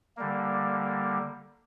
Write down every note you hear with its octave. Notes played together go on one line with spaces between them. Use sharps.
D3 G3 A#3